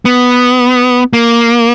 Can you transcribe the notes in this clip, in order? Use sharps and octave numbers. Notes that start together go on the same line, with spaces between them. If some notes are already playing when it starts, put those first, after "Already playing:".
B3
A#3